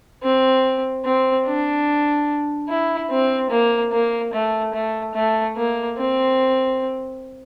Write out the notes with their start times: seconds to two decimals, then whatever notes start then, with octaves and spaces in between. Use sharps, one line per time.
0.23 C4
1.05 C4
1.46 D4
2.69 E4
3.10 C4
3.50 A#3
3.93 A#3
4.33 A3
4.74 A3
5.15 A3
5.56 A#3
5.98 C4